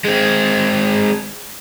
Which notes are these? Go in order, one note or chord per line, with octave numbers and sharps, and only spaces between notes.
G#3 C4